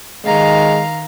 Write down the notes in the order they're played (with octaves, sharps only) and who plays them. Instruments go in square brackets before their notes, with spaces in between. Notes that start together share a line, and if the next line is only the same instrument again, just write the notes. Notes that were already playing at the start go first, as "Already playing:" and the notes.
[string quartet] D#3 F5 A#5 [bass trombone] G#3